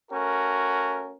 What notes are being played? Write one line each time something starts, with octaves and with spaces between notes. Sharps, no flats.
A3 C#4 F#4 A#4